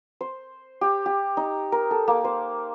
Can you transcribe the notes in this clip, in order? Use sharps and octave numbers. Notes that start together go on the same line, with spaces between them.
C5
G4
G4
D#4
A#4
A4
A#3
C5